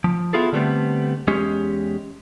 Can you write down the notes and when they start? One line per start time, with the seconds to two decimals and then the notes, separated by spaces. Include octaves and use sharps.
0.04 F3
0.33 B3 E4 F4 G#4 A4
0.53 D3 G3 A3 B3 C4
1.27 E2 G#3 C#4 G4